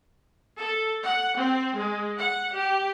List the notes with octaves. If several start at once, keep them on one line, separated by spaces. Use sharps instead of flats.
A4
F#5
C4
G#3
F#5
G4